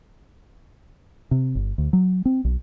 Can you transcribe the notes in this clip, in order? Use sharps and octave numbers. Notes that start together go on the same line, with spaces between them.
C3
G1
D2
F#3
C4
B1